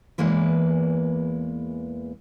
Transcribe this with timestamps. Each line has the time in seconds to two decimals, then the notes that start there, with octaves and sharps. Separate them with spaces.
0.18 E2 E3 G#3 A#3 B4